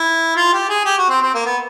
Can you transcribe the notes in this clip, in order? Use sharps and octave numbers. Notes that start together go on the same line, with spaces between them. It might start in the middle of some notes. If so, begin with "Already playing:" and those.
Already playing: E4
F4
G4
G#4
G4
F#4
C4
C4
A#3
B3